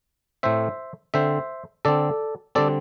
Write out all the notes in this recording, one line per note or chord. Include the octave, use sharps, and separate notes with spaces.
A2 A3 C4 C5 E5
D3 C4 C5 E5
D3 C4 A4 D5
D3 G3 C4 A4 D5